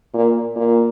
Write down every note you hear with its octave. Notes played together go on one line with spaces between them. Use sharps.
A#2
A#2